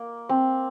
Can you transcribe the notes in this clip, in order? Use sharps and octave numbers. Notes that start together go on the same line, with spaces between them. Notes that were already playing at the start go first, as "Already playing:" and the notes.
Already playing: A#3
C4